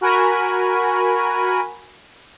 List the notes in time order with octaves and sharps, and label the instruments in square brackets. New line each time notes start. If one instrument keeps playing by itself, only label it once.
[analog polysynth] F#4 A#4 G#5 B5